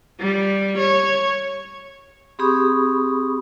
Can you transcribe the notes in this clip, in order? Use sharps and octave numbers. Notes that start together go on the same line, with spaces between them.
G3
C#5
C4 G4 G#4 B5 C#6 D#6